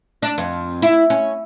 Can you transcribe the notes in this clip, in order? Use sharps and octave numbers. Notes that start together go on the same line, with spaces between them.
D4
F2
E4
C#4